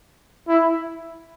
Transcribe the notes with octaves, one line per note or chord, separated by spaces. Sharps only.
E4